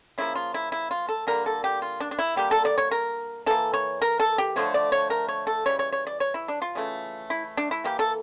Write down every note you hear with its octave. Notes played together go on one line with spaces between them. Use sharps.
C#3 F3 A#3 E4
F4
E4
E4
F4
A4
D3 G3 A#3 A#4
A4
G4
F4
D4
D4
E4
D3 G3 A#3 G4
A4
D5
C#5
A#4
E3 A#3 A4
C#5
A#4
A4
G4
D3 F3 A3 C#5
D5
C#5
A#4
C#5
A4
C#3 E3 G3 C#5
C#5
C#5
D5
C#5
E4
D4
F4
C#3 E3 A3
E4
D4
E4
E3 A#3 G4
A4